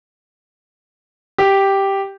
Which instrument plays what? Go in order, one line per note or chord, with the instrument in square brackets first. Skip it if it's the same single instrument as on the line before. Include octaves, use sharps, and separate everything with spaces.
[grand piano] G4